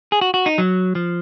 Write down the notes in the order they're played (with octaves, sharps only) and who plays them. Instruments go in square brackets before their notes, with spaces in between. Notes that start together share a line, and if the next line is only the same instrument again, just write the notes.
[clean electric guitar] G#4
F#4
F#4
D#4
F#3
F3